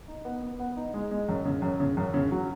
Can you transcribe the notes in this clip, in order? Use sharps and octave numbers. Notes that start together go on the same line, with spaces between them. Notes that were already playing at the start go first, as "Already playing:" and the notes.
D#4
B3
B3
B3
D#4
G#3
G#3
F#2
C#3
F#2
C#3
F#2
C#3
F#3